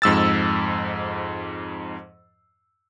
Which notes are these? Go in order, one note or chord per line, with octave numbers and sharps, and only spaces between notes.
F2 G#2 E6 A6